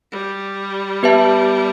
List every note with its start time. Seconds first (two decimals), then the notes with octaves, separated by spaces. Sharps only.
0.12 G3
1.03 B3 G4 B4 E5 A5